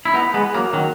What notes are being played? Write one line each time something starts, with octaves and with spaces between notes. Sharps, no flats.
E4
B3 D#4
G#3 B3
F#3 A#3
D#3 F#3